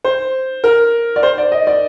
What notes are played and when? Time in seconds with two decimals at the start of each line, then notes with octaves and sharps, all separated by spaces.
0.04 C5
0.64 A#4
1.16 D5
1.23 C5
1.38 D5
1.52 D#5
1.67 D5